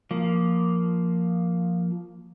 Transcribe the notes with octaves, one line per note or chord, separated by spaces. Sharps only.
F3 A#3